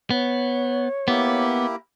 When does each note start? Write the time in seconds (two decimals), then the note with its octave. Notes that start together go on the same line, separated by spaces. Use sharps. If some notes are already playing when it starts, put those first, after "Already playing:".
0.11 B3 C#5
1.08 A#3 B3 E4 G4